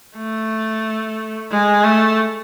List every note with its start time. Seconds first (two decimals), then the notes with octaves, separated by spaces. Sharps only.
0.16 A3
1.51 G#3
1.84 A3